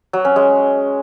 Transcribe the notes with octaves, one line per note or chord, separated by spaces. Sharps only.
F#3
C#4
G#3